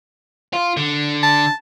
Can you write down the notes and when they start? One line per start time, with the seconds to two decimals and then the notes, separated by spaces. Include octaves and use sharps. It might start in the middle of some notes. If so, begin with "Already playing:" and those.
0.54 F4
0.77 D3
1.23 A5